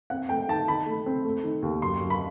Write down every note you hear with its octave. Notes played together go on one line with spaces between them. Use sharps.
C4 F#5
A3 G5
D#3 A5
D#3 B5
A3
C4
A3
D#3
D#2
F#2 C6
F#2
B5